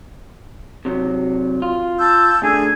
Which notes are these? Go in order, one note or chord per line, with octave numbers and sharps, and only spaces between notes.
C3 F#3
F4
A5 E6 G6
D2 D3 G#4 G#5